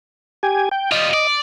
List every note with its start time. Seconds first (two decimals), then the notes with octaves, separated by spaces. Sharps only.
0.43 G4 G#5
0.71 G5
0.92 G3 F4 D#5
1.14 D5